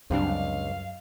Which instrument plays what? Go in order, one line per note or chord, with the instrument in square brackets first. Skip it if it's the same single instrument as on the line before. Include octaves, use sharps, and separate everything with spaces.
[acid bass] C#2 [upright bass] F#2 [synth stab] C3 G3 D4 [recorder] F5